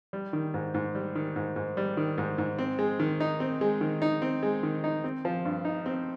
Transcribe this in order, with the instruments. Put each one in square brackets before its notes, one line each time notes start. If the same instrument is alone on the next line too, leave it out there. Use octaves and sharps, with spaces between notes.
[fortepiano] G3
D#3
G#2
G#2
G3
D#3
G#2
G#2
G3
D#3
G#2
G#2
C4
G#3
D#3
D#4
C4
G#3
D#3
D#4
C4
G#3
D#3
D#4
C4
F3
G2
D#4
C4